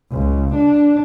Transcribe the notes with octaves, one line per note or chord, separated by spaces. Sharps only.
C#2
D4